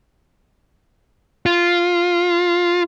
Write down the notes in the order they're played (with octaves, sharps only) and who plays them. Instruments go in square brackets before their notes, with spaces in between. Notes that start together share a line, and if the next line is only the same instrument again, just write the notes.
[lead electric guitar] F4